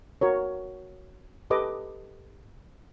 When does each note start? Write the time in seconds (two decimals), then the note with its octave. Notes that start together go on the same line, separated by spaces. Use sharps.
0.21 F#4 A#4 C#5
1.50 G4 A4 B4 D#5 D6